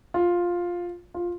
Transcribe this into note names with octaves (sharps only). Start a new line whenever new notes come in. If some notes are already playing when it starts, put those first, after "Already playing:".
F4
F4